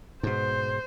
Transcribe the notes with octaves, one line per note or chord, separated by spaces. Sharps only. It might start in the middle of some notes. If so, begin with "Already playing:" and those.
G#2 B2 C5